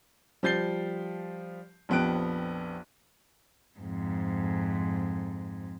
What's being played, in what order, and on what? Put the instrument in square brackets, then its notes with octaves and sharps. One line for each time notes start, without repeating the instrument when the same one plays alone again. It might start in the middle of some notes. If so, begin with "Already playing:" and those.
[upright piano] F3 G3 G6 A6 C7 G7
A#1 F2 B3 G4 F#6 D7
[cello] F2 G#2